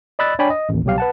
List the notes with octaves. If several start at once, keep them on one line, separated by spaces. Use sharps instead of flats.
D5 D#5 B5 E6 F#6 A6
D4 C#5 D5 G5 G#5 B5
D#5
A1 D#2
C2 B2 F#3 G4 F5
B4 F#5 A5